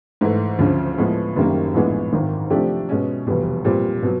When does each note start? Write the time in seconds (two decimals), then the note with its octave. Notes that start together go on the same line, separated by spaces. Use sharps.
0.21 G#2 E3 A3
0.59 D2 C#3 F3
0.98 A2 F3 G#3 B3
1.36 F#1 F#2 D#3 G3 A#3
1.74 A#1 A2 E3 G#3 B3
2.12 G#1 G#2 D#3
2.50 C3 F3 A3 D4 G4
2.89 B2 G#3 C#4
3.27 F1 E2 B2 G3
3.65 A#2 G3 C4
4.03 B2 F#3